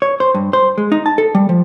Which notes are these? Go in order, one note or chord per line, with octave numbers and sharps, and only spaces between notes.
C#5
C5
G2
C5
G#3
D#4
A5
A4
G3
F3